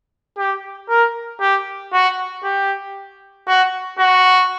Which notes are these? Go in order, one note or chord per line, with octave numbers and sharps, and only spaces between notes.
G4
A#4
G4
F#4
G4
F#4
F#4